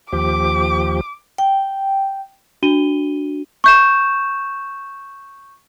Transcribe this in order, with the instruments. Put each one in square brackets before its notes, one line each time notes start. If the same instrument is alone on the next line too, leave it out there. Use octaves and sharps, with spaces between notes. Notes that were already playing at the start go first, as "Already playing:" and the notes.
[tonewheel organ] D#2 F3 G4 [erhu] D6
[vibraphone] G5
[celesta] D4 F#4 D#7 G7
C#6 G6 E7